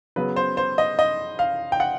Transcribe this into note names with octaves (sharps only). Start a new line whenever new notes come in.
C#3 F#3 B3 B4
C5
C5
D#5
D#5
F5
G5
F#5